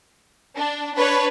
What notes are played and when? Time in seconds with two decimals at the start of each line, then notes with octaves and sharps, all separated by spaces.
0.57 D4
0.95 D4 B4 C#5